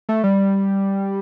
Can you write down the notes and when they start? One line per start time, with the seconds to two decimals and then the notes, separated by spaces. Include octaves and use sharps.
0.09 A3
0.24 G3